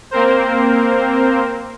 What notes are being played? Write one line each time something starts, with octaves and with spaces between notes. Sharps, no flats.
A#3 C4 A#4 C5